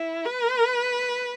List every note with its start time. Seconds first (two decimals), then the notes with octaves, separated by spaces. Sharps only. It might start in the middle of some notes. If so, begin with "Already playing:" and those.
Already playing: E4
0.26 B4